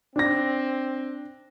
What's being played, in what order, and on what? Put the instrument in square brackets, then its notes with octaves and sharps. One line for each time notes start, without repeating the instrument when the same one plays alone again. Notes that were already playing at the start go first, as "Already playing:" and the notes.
[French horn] C4 [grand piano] D4 A#6